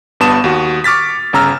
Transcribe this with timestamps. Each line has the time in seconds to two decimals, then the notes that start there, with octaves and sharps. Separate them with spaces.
0.20 G1 G2 B3 A5 D#6 E7
0.44 D#2 F#4
0.84 C#6 D6 F6 A6 B6
1.33 G1 C#3 A#5 E6 F6